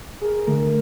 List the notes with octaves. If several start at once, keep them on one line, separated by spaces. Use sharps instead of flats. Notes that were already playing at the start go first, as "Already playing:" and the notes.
G#4 A#4
D3 A3 A#4